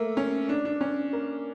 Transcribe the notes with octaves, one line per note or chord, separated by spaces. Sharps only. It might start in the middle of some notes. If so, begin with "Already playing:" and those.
Already playing: A3 A#3
C#4
D4
D4
C#4
A#3